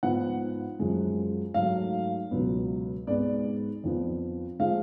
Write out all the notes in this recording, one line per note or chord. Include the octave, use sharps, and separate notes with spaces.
G#2 F3 B3 F#5
F#2 F3 G#3
G#2 F#3 A3 F5
C#2 B2 F#3 B3
G#2 G#3 B3 D5
F2 F3 B3
F3 G#3 F5